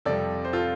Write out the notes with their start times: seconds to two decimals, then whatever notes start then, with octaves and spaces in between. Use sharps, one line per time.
0.05 F2 C3 G3 A4 D5
0.45 C5
0.53 F4 A4